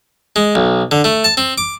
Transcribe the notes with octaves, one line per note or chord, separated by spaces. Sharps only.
G#3
B1
D3
A3
A5
C4
D6